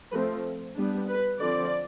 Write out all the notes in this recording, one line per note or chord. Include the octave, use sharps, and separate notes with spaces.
F3 A3 C4 B4
G3 B3 D4
B4
D3 F3 C4 D5